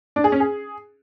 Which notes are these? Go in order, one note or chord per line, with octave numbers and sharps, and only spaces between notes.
D4
G#4
C#4
G#4